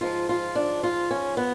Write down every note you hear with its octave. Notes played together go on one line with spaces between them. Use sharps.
G#2 F3 F4
F4
D4
F4
C#4
B3